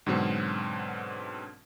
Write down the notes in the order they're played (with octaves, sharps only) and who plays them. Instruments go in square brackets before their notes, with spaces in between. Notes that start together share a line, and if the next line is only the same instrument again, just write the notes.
[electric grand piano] G#2 B2 D3 F#3 C4